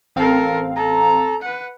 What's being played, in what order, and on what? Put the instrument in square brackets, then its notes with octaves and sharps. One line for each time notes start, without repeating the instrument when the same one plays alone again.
[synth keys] A1 C4 F5 [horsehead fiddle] A4 A#4
[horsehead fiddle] A4 [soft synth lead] A#5
[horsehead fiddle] B4 F#5